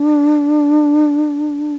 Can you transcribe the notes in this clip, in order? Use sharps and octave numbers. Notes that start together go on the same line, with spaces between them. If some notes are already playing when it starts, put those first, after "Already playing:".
Already playing: D4